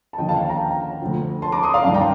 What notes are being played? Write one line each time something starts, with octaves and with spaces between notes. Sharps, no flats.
A5
D#2 D3 F3 D#5 G5
F5 A5
F5 A5
G5 A#5
D2 D3 F3
A5 C6
A#5 D6
C6 D#6
D5 F5
G2 D#3 F5 A5
G5 A#5